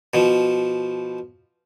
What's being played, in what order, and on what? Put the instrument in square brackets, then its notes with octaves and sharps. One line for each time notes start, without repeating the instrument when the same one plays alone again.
[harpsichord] B2 F3